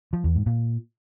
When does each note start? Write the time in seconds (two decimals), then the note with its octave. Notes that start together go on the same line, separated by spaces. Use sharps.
0.13 F3
0.24 E2
0.35 G#2
0.46 A#2